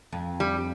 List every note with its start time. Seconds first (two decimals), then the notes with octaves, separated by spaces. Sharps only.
0.13 F2
0.40 G3